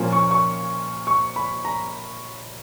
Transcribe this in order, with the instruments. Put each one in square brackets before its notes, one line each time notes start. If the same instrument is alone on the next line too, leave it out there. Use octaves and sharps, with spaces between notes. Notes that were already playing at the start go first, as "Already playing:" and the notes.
Already playing: [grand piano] A#2 F3 A#3 C#4
C#6
C#6
C#6
B5
A#5